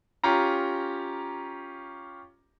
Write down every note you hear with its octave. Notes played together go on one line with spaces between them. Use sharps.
C#4 F4 G4 A#5